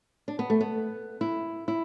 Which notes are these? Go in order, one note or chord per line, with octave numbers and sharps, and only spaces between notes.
D4
B3
A3
B3
E4
E4